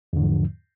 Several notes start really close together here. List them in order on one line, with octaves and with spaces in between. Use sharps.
E2 D3 G#2 F3